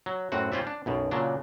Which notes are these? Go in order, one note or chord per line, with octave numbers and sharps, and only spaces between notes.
F#3
F#2 A2 C4 F#4 F#5
G3 C#4 F4 C5 D5 E5
D4
B1 F#2 B2
A#2 C#3 F#3 D4